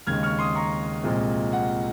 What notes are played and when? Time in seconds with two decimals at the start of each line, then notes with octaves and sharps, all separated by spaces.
0.07 D#2 C#3 G#3 F6 G#6
0.23 C#6 F6
0.39 C6 D#6
0.55 A#5 C#6
1.03 C2 A#2 F3 G#3 C4
1.53 F#5